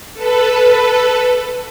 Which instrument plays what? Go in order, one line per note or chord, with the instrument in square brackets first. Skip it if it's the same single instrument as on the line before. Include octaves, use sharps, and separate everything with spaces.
[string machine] A4 B4